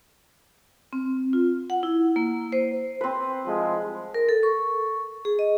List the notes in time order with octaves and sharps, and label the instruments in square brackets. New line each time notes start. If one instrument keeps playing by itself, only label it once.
[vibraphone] C4
F4
F#5
E4
A#3
C5
[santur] C4 B4
[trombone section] C2 F3 G#3
[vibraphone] A#4
A4
C#6
G#4
D#5